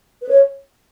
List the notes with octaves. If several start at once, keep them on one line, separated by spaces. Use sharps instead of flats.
B4
C#5